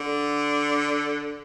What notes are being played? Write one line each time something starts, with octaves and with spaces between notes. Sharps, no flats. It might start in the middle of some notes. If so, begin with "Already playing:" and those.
Already playing: D3